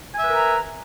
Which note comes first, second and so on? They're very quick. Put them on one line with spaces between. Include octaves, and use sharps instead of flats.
G#5 E5 B4 A#4 A#5